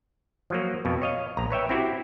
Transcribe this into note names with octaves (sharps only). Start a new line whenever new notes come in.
F3 F#3 A#3
F2 B2
C#5 D#5 F5
A#1 A#5
B4 C#5 E5 G5
C4 E4 F#4 G4